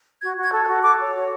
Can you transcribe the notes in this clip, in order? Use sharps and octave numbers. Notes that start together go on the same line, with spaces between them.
F#4 G#6
F#4
G#6
A4
F#6
F#4
A4 D6
C#5
F#4